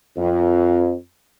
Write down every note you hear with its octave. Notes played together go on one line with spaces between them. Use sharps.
F2